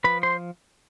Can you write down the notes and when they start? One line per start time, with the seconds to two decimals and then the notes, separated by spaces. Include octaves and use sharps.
0.04 F3 B4 B5
0.23 C5 C6